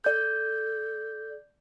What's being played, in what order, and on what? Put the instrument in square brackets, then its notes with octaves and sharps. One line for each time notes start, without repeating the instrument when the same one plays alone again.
[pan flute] A4 [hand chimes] D5 G6